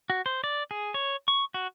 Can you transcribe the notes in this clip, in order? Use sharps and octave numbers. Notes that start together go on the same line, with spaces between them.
F#4
C5
D5
G#4
C#5
C#6
F#4